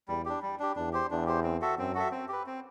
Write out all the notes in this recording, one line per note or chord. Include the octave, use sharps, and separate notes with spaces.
E2 G3
D4 G4
G3
D4 G4
E2 D4
G4 C5
E2 D4
G4 C5
C4
F#4 A4 E5
F#2 C4
F#4 A4 E5
C4
G4 B4
C4